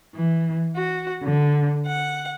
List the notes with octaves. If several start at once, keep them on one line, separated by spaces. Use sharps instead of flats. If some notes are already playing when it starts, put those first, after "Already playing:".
E3
F#4
D3
F#5